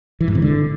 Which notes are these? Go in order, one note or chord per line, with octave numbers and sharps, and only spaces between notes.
E3
G#2
C3
D3